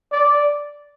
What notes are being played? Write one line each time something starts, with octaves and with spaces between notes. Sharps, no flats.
D5